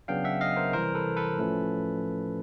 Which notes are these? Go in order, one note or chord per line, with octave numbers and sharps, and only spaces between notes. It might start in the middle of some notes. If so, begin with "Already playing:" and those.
C#3 F#3 B3 D4 F5 G5
E5 F#5
D#5 F5
A#4 C5
C3 E3 G3 A#4 C5
A4 B4
A4 B4
A2 F3 A3 C#4